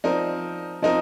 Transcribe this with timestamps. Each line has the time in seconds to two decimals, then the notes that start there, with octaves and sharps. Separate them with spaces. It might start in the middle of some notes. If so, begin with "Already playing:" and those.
0.04 F3 C4 D#4 A#4 D5
0.82 F3 C4 D#4 A#4 D#5